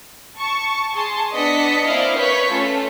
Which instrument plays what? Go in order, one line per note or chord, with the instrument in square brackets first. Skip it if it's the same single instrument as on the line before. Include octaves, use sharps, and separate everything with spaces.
[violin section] A5 C#6
G#4 A5 C6
B3 D4 D#5 A5 B6 C#7
A#3 C4 E4 D5 D#5 F5
B4 C#5 C#6 G6 B6
A3 C#4 F4 A4